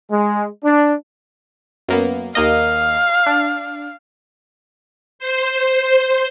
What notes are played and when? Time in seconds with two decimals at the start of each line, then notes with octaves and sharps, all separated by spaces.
0.11 G#3
0.65 D4
1.89 F#2 A#3 B3
2.35 D#2 A#3 D#5 F5
3.26 D4
5.19 C5